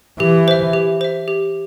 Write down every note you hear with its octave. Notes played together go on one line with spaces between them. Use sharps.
E3 G4
C5 E5
G4
C5 E5
G4